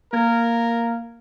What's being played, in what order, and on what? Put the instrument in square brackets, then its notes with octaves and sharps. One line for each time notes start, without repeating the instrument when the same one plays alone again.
[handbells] A#3 G#6 [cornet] A#4